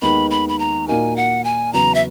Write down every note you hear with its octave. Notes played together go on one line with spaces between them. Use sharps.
D#2 D#3 G#3 B3 B5
B5
B5
A#5
A#2 A#3 D#4 F#4 A#4 G#5
F#5
G#5
E2 C#3 F#3 B3 F#4 A#5
E5